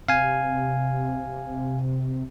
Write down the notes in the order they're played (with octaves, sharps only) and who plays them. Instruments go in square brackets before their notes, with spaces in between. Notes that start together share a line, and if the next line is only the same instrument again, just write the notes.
[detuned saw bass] C3 [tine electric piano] F5 G#5